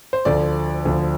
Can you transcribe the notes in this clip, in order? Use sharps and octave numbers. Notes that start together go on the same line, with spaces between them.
C5
D2 D3 F3 D5
D2 D3 F3